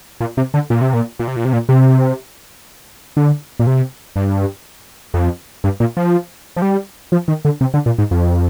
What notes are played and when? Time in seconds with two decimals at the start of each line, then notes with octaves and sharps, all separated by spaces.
0.21 A#2
0.37 C3
0.54 D3
0.70 A#2
0.81 C3
0.93 A#2
1.19 A#2
1.28 C3
1.36 A#2
1.45 C3
1.53 A#2
1.69 C3
3.17 D3
3.59 A#2
3.67 C3
4.16 G2
5.14 F2
5.64 G2
5.80 A#2
5.97 F3
6.57 F3
6.62 G3
7.12 F3
7.28 D#3
7.45 D3
7.61 C3
7.74 D3
7.86 A#2
7.98 G#2
8.11 F2